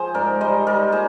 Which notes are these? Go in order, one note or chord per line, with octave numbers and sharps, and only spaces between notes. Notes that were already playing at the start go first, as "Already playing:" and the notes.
Already playing: F3 G#4 C5
G#2 A#4 D5
G3 C5 D#5
G3 A#4 D5
A#2 G#4 C5